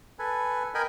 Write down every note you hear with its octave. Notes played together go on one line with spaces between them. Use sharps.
A4 B4 G#5
A#4 D#5 G5 G#5 B5